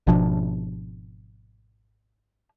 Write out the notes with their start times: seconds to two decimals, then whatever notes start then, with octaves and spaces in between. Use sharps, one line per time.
0.07 G#1 B2 F3 D4